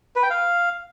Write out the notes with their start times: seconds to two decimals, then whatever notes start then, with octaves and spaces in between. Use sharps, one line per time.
0.16 B4
0.23 G5
0.30 F5